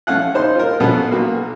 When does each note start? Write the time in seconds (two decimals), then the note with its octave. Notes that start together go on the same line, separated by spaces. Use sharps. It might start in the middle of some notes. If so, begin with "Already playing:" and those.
0.07 A3 C#4 F5 F#5 F#6
0.34 D#4 C5 C6
0.55 F4 A#4
0.80 B2 B3 C#4 A4 B4 F#5
1.11 B1 A#3 F#4